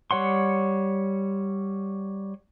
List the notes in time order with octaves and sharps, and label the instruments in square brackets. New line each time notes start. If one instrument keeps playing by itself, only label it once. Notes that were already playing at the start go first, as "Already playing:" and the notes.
[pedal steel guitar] G3 C#5 F#5 C6